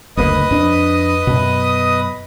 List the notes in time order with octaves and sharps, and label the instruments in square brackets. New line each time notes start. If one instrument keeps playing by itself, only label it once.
[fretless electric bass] F#1 D2 A#3 [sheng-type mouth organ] B4 D#5 D#6
[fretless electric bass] F2 D4
F#2 B2